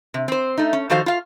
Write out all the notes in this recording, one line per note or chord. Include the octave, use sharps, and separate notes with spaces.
C3
C4 C5
A3 D#4
C#4
D#3 F3 F#4 A4 C5 F5
F4 F5